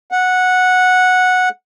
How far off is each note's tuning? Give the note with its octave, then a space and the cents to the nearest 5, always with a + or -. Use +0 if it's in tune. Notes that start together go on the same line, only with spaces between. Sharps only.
F#5 -10